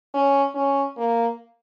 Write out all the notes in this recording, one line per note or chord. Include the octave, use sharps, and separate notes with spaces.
C#4
C#4
A#3